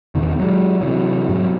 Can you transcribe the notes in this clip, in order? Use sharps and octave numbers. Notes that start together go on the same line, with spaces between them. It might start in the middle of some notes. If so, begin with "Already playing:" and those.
E2 B2 D#3
F#3 G#3
C3 E3 F#3
G#2 B2 F#3